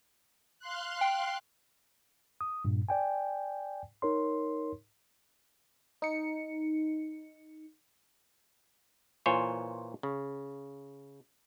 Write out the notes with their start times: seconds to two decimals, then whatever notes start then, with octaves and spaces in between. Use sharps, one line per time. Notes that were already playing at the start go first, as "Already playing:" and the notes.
0.59 F5 C6 F#6
1.01 G5
2.41 D#6
2.65 G2 A#2
2.89 D5 G5 G#5
4.02 D#4 A#4 C#5 C6
6.02 D#4 C#7
9.26 A#2 E3 F4 C5 C#5 G#5
10.03 C#3